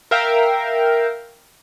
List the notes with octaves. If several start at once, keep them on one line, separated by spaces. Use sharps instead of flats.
A#4 E5 F5 G5